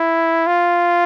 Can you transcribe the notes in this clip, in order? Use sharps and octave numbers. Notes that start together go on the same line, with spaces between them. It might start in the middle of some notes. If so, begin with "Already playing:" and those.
Already playing: E4
F4